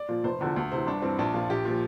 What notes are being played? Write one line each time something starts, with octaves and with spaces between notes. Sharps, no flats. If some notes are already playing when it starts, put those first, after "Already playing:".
Already playing: D5
A#2 F3
F1 C5
E2 D3 F3
D2
C3 E3 C5
G1 D4
G2 E3 C4
A#1 D4
A#2 F3 F4
A#1 G4
A#2 F3